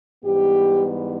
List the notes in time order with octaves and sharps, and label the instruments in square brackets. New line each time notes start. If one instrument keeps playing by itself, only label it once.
[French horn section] G#2 E3 G3 B3 G4